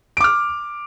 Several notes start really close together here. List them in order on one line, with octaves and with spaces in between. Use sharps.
D7 D6 F6